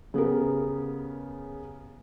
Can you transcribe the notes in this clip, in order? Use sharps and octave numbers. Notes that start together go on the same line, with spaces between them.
C#3 B3 G4 A#4